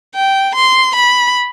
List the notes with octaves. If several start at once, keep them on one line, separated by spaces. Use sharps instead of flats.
G5
C6
B5